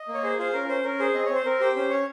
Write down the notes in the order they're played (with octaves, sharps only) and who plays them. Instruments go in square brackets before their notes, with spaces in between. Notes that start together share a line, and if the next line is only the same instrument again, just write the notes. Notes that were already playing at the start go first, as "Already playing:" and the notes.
Already playing: [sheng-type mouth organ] D#5
A#3
C#5
G#4 C5
F4 C5
C#4 A#4
C#4 C5
C#4 A#4
G#4 C5
C4 D#5
C4 C#5
C5
C4 A#4
G4 C5
C#4 C5
C#4 C#5